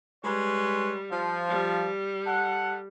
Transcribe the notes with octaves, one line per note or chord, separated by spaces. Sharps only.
G3 G#3 B4 C#5
F3
G3
A4 F#5